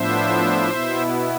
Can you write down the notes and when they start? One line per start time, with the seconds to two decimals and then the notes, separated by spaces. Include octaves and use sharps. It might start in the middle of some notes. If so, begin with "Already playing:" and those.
Already playing: A2 F3 B3 D4 C5 E5
0.70 B2 B3 E4